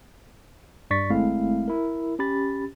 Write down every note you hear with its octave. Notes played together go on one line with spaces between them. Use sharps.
G2 D5 C#6 A6 B6
G1 G#3 A3 C4 E4 F5
E4 A#4
C#4 G4 B5 A6